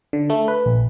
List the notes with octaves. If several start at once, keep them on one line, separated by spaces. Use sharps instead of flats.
D3
A3
B4
A#1